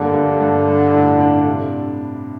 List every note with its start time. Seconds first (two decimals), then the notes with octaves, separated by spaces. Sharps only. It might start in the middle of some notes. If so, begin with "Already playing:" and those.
Already playing: G2 D3 A#3
0.14 G2
0.40 G2
0.67 G3
0.94 A2
1.20 D4
1.46 C3